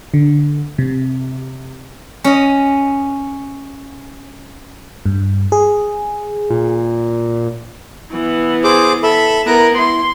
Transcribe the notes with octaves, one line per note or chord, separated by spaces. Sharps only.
D3
C3
C#4 D#5
G2
G#4
A#2
E3 B3
G#4 C5 D6
A4 E5 B5
B3 E4 A#4 A#5 F#6
E4 C6